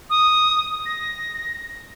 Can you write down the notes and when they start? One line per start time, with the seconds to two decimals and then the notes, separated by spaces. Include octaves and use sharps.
0.10 D#6
0.86 A#6